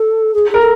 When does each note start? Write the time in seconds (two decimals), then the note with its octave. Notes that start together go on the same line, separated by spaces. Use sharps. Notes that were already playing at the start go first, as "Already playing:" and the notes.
Already playing: A4
0.33 G#4
0.50 G#4 A#4
0.60 A4